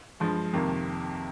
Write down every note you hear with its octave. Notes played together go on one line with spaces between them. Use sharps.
G2 F3 G#3
F2 C3 D#3 A#3